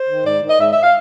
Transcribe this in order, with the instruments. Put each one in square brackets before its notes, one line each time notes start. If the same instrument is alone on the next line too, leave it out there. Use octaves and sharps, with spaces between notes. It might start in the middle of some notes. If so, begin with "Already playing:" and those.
Already playing: [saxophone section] C5
D#3
G#2 D5
D#3
D#5
G#2 E5
E5
F5